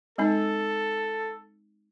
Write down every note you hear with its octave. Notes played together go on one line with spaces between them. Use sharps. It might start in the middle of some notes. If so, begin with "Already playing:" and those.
G#3 C4 D#4 A4